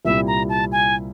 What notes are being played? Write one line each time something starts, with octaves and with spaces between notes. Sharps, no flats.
C2 A#2 G3 C4 E4 E5
A#5
A5
G#5